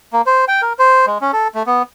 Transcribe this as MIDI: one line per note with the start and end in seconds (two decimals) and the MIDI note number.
0.13 0.22 58
0.26 0.45 72
0.48 0.62 79
0.62 0.73 70
0.79 1.06 72
1.07 1.18 56
1.21 1.32 61
1.33 1.48 69
1.55 1.63 57
1.67 1.83 59